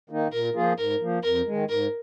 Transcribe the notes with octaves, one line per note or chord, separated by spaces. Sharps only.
D#3 A#3 D#4
A#2 A#4
F3 A#3 F4 G#4
G#2 A#4
F3 A#3
F2 A#4
D#3 G#3
G#2 A#4